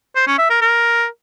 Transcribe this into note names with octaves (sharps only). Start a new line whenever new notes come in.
C5
C#4
E5
A#4
A#4